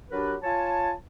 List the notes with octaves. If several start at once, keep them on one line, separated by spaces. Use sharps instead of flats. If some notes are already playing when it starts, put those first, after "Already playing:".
F#3 D4 G4 A#4 B4
F4 C#5 G#5 A5